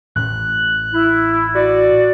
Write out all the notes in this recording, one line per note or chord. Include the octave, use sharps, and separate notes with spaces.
A1 A2 C#4 F#6
E4
F#4 D5